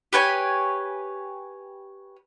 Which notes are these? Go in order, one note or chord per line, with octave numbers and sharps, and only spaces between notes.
G4 B4 C#5 G#5